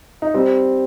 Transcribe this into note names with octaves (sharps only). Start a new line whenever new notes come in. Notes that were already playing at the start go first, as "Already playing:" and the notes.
D#4
G3 C4